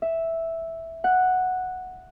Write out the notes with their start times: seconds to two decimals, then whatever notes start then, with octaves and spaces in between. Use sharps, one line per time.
0.02 E5
1.04 F#5